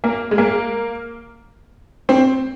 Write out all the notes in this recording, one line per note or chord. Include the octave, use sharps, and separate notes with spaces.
A#3
G#3
A#3
C4